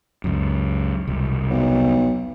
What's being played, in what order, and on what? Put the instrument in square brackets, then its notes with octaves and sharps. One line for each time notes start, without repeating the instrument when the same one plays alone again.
[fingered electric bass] C#2 F#2
E1 C2
[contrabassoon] B1